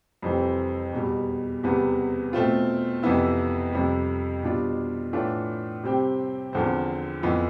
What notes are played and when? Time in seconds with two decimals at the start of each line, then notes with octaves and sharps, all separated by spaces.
0.22 F2 C3 E3 G3 C4
0.93 E2 B2 G3
1.63 E2 C3 G3 B3
2.33 B2 A3 C4 F4
3.03 F2 C3 E3 B3 E4
3.72 F2 C3 G3
4.43 B2 G3 D4 F4
5.13 A2 E3 A3 D4 F4
5.84 C3 G3 C4 G4
6.53 E2 D3 F3 C4
7.22 F2 E3 B3 F4